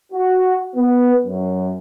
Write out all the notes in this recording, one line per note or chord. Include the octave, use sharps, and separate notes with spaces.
F#4
B3
F#2